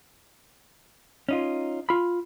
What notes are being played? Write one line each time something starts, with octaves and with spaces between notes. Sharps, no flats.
C#4 D#4 F4
F4 B5